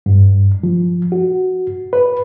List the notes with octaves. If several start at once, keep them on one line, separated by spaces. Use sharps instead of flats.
G2
F3
F#4
B4